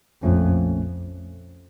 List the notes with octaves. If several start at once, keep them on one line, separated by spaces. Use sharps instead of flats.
A#1 F2 A#2 F3 A3 C#4